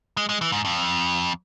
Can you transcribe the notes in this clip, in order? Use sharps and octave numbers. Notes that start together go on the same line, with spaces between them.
G#3
G#3
E3
G#2
F2